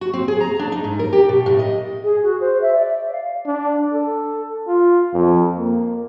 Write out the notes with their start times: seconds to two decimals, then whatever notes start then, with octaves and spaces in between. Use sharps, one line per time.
0.01 F#4
0.13 C4
0.28 G#4
0.41 A#5
0.59 D4
0.72 D#4
0.84 G#2
0.99 A#4
1.13 G4
1.29 B2
1.46 A2
1.59 D#5
2.03 G#4
2.22 F#4
2.40 C5
2.61 E5
2.74 D5
3.11 F5
3.46 D4
3.94 A4
4.68 F4
5.14 F2
5.57 A#3